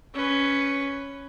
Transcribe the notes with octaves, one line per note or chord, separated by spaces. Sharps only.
C#4 B4